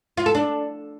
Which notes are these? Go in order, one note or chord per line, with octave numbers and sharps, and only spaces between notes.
F4
A4
D4